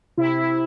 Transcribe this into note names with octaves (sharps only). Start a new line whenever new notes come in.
C3 E4
E4